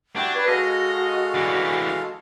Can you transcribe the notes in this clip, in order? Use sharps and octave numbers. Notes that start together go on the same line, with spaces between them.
D4 E4 F#4 G4
B4 C#5
G#3 F#4 A4 D#5 F5
E3 D4